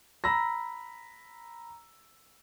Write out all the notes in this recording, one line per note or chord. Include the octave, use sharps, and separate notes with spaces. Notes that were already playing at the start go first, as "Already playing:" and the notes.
A#5 B5 E6 A#6